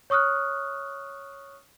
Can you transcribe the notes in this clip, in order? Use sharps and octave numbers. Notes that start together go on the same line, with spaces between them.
C#5 C#6 D#6 F6 F#6